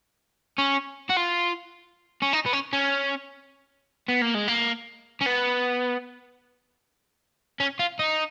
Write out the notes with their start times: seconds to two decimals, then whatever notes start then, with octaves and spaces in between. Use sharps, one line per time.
0.59 C#4
1.10 F#4
1.17 F4
2.22 C#4
2.33 D#4
2.46 B3
2.53 C#4
2.73 C#4
4.09 B3
4.22 A#3
4.35 G#3
4.48 A#3
5.21 C#4
5.26 B3
7.60 C#4
7.80 F4
7.99 D#4